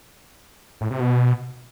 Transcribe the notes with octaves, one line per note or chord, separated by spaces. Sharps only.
A2
C3
B2